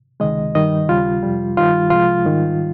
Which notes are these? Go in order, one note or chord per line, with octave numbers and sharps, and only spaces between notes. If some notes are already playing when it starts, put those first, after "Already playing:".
C#2 C3 D#3 G#3 D#5
G2 D#3 G3 D#5
D#2 C#3 G3 F4
F2 C3 G3
G2 D#3 G3 F4
C2 C3 F3 G#3 F4
G#2 D#3 G3